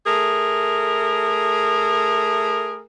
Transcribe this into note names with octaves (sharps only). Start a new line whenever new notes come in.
A3 G#4 A#4